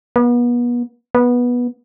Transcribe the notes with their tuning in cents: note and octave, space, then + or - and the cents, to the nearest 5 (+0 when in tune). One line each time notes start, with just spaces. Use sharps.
B3 -35
B3 -15